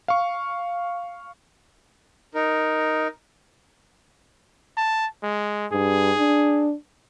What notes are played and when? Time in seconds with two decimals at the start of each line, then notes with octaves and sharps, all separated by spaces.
0.08 F5 C#6
2.35 D#4 A#4
4.77 A5
5.23 G#3
5.72 G2 G#4
6.17 D4